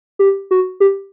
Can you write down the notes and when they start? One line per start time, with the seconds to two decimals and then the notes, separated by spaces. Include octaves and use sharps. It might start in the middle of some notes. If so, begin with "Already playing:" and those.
0.19 G4
0.51 F#4
0.80 G4